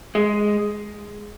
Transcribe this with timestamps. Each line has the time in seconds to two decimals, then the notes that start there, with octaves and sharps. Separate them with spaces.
0.15 G#3